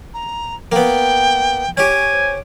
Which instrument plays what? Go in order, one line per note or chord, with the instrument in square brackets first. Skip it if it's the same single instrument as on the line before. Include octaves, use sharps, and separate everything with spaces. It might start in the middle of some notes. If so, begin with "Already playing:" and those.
[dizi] A#5
[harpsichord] A#3 B3 [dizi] G5
[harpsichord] C#4 G4 [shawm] G#5
[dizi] C5